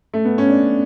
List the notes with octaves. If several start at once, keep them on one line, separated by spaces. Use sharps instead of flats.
A3
B3
C#4
D4